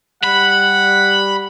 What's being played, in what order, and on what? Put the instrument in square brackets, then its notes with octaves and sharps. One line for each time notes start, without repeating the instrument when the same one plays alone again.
[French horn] G3 [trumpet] F#5 [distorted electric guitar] B5